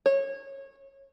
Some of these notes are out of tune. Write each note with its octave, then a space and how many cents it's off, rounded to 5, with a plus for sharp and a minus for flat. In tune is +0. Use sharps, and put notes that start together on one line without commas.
C#5 -20